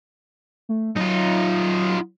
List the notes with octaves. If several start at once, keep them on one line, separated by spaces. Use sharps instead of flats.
A3
F#3 D#4 F4